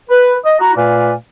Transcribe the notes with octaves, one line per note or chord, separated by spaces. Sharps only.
B4
D#5
E4 F#4 A#5
A#2 A3 B4 D5 F5 G#5